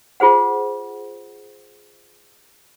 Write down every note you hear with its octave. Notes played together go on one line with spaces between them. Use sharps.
F4 G#4 C5 F#5